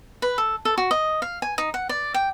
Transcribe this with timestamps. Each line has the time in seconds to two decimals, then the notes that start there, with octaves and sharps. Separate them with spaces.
0.22 B4
0.38 A4
0.65 A4
0.78 F#4
0.91 D#5
1.22 F5
1.42 G#5
1.58 D#4
1.74 F#5
1.89 D5
2.14 G5